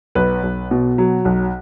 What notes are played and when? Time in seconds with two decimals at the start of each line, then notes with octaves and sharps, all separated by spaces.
0.15 B1 B4
0.43 B1
0.71 B2
0.98 F#3
1.25 B1